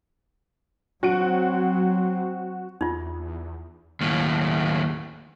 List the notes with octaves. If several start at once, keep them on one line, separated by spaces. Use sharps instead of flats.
F#3 C4 F#4 F#5 D7
E2 D#4 F4
D#2 A2